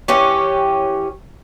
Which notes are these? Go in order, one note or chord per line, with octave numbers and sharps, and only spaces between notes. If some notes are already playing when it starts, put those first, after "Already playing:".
E3 C#4 G4